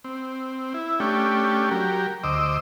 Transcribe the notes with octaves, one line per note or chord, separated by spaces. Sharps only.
C4
E4
A3 C#4 D4 G4
F#3 G4 A#4
D2 C5 D#5 D6 E6